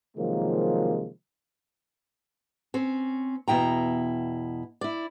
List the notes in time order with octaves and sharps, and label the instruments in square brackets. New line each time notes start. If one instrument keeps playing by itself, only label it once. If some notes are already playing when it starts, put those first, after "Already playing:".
[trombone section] C3 D#3 F3 F#3 G#3 A#3
[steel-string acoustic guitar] C4 C#4
E2 B2 E4 G5 A#5
E4 D5